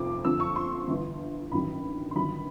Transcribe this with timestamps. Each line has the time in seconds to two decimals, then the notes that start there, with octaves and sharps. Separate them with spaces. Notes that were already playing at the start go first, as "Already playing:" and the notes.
Already playing: F1 F2 F3 D6
0.24 F2 D3 F3 E6
0.40 C#6
0.56 C6
0.88 G1 G2 E3
1.52 A1 G2 D#3 F#3 B5
2.11 C6
2.16 G1 G2 D#3 F#3 B5